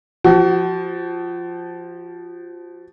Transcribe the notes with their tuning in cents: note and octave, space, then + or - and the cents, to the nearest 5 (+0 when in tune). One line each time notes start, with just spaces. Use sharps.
F3 +0 F#4 +35